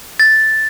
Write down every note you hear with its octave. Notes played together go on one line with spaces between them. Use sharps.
A6